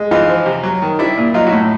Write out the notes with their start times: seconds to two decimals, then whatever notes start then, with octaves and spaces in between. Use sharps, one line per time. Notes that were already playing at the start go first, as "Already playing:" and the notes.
Already playing: G#3
0.11 E3 D#4 F4
0.29 F3
0.46 C3
0.63 F#3
0.82 D#3
0.99 G3 D4 E4
1.18 A#2
1.34 F#3 D#4 F4
1.46 E4 F#4
1.52 A2